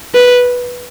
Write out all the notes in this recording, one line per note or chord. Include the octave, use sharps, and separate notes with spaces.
B4